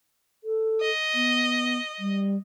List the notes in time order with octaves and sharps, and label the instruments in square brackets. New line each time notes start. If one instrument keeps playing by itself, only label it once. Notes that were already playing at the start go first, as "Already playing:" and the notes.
[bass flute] A4
[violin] D#5
[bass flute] B3
G3